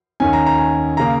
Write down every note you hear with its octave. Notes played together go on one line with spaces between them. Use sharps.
D#2 D#3 C#4 G#5
A#5
A#5
G#5
C#3 A#3 A#5